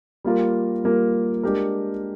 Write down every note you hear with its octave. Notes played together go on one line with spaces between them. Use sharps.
G3 A#3 F4 A#4
G3 A#3 F4 A#4
G#3 D4 G4 A#4